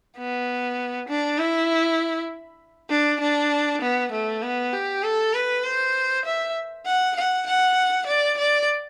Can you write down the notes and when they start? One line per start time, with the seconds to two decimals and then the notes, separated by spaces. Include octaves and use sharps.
0.17 B3
1.08 D4
1.38 E4
2.90 D4
3.21 D4
3.82 B3
4.12 A3
4.42 B3
4.73 G4
5.03 A4
5.34 B4
5.64 C5
6.25 E5
6.86 F#5
7.16 F#5
7.47 F#5
8.07 D5
8.38 D5